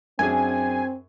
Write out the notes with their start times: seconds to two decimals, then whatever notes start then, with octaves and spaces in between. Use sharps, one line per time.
0.19 F#2 C4 D4 G#4 G#5